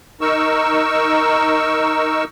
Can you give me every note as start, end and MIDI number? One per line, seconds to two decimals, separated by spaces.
0.21 2.24 63
0.21 2.24 70
0.21 2.24 85
0.21 2.24 88